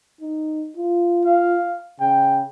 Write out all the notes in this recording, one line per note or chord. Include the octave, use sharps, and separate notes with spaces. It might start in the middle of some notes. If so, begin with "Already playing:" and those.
D#4
F4
F5
C#3 G5